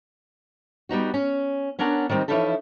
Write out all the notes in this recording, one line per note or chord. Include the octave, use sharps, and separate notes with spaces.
G3 B3 D#4 F#4
C#4
B3 C#4 D4 A#4 F#5
D#3 G3 C4 D4 D#4
E3 F3 C#4 D#4 E4 A4